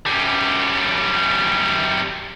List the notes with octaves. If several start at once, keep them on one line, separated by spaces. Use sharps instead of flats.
F#2 G3